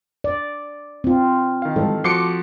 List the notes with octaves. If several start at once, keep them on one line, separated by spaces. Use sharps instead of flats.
D5
C4 F4
D#3 F5
G#2 E3 G3 A4
F3 F#4 C6 D6 C#7